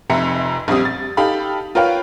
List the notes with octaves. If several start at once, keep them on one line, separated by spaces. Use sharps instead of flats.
F1 F2 E5 A#5 C#7
A#1 F2 G3 C4 D#6
A6
D#4 G4 A4 F5 B5
F4 A#4 B4 C#5 F5 G5